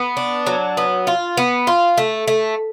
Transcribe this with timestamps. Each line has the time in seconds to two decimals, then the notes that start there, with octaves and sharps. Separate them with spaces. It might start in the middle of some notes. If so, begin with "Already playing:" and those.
Already playing: B3
0.17 D4
0.47 F#3
0.77 B3
1.07 F4
1.37 B3
1.67 F4
1.98 A3
2.28 A3